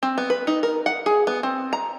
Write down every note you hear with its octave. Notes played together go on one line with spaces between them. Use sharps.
C4
B3
B4
D#4
A#4
F#5
G#4
B3
C4
A#5